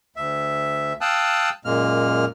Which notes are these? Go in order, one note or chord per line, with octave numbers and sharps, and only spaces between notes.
D2 E5
F5 G5 A5 D#6 E6 F#6
F#2 A#2 G#3 A#3 F6